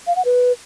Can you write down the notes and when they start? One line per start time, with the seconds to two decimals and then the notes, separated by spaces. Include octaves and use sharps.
0.07 F5
0.16 F#5
0.25 B4